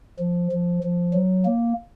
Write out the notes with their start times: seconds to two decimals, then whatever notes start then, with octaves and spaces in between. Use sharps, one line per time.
0.19 F3
0.52 F3
0.83 F3
1.13 F#3
1.45 A#3